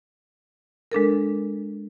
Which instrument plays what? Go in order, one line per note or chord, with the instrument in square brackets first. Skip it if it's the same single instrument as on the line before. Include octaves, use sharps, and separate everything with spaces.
[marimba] G#3 D4 A4 A#4